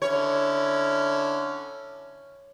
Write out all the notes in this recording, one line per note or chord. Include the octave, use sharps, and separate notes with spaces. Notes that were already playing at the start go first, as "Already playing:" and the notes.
D3 C#4 E4 C#5